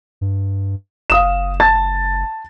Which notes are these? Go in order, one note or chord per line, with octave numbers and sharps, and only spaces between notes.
G2
F#1 F5 D#6 E7
A5 A6